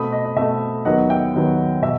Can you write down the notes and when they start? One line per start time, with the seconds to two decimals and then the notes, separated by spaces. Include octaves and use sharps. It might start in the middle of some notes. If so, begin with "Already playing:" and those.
Already playing: B2 A3 C4 B5 D#6
0.12 D#5
0.25 D#5
0.36 B2 A3 C4 E5
0.85 D#2 D#3 F#3 B3 D#5 F#5
1.10 E5 G5
1.34 D#2 D#3 F#3 B3
1.82 B2 E5